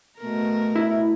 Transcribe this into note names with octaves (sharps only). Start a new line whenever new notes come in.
B2 A3 A#4
E4